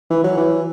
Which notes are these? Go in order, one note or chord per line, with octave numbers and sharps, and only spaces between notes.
E3
F#3
E3